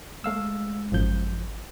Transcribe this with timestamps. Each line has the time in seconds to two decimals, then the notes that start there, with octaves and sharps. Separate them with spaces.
0.24 G#3 A3 F5 E6
0.92 G#1 F#2 F3 G6